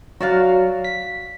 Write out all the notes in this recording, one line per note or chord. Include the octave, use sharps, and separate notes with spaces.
F#3 F#4 D5 F5
B6